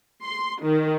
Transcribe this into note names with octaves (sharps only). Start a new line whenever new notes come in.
C6
D#3